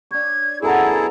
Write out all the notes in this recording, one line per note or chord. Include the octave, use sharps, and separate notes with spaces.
D4 C#5 G#6
F#2 B2 E4 G#4 A4 F#5 A#5